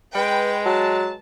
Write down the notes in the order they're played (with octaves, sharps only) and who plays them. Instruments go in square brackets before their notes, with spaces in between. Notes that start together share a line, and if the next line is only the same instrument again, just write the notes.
[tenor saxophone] G#3 [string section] B4 G5
[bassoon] F#3 [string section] A5